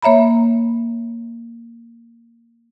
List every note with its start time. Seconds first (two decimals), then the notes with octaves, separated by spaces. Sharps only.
0.02 A#3 C#5 E5 A#5 B5